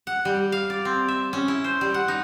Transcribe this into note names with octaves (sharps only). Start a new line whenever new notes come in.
F#5
G3
F5
D5
C4
E5
C#4
E4
C5
G3
F#5
D#4